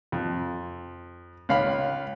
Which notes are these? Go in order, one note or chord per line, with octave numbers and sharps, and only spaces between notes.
F2
C#2 F5 B5